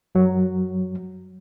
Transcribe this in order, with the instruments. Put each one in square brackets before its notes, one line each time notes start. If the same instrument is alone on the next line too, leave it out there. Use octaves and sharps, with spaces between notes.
[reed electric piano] F#2 F#3